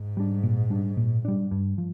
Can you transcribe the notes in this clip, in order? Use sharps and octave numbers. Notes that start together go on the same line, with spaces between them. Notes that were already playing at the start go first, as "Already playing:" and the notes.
Already playing: G#2
G3 D4
A#2
G3 D4
A#2
G3 D4
G2
F3